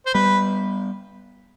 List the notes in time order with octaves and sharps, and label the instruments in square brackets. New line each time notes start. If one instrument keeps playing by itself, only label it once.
[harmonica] C5
[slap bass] G3 B3 [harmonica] B4